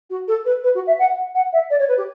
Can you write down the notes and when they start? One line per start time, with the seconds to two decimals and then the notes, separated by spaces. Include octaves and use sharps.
0.10 F#4
0.28 A4
0.45 B4
0.63 B4
0.74 F#4
0.87 E5
0.99 F#5
1.34 F#5
1.52 E5
1.70 D5
1.79 C#5
1.88 B4
1.97 G4